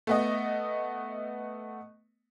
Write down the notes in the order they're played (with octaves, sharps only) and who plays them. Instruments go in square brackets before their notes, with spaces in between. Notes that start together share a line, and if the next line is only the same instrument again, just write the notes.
[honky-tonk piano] A3 B3 D#5